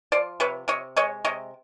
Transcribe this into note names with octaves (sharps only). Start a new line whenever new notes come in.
F3 C5 D5
C3 B4 C#5
C3 C#5 D#5
G#3 C#5 D#5
C3 C#5 D#5